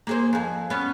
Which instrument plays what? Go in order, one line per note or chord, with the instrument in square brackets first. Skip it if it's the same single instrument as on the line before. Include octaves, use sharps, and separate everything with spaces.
[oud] A#3 G#4 C5
F2 G#4
B3 C#4